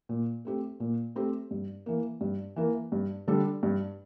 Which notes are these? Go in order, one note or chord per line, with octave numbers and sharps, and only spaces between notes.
A#2
A3 C4 G4
A#2
A3 C4 G4
G2
E3 A#3
G2
E3 A#3
G2
D3 G3 D4 A4
G2